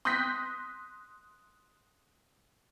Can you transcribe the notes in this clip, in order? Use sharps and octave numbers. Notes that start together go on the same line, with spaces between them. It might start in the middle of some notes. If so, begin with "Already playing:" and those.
C6 D#6 F#6 G6 A#6 B6